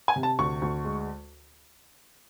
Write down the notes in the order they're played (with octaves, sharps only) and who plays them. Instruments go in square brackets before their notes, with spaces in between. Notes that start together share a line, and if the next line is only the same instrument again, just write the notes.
[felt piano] G#5
C3
A5
D2 C#6
D2
G#3